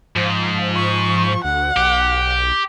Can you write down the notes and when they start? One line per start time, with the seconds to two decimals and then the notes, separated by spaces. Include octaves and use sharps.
0.16 G#2 F3
0.76 C#6
1.44 D2 F#5
1.77 B1 G4